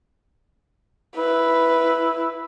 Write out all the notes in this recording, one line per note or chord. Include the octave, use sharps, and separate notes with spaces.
E4 B4